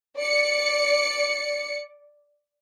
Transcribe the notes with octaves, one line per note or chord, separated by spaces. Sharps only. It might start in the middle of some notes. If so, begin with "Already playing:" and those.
D5 C#7